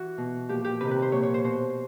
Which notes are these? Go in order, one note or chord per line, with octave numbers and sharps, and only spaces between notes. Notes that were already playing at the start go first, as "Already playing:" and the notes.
Already playing: E3 F#4
B2
A#2 F3 G4
G4
C3 D#3 B4
B4
C5
A#2 F3 C#5
C#5
C5
B2 C5